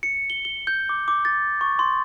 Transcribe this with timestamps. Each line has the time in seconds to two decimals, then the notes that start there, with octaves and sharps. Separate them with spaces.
0.03 C#7
0.30 G7
0.45 G7
0.67 G6
0.89 D6
1.08 D6
1.25 A6
1.61 C#6
1.79 C6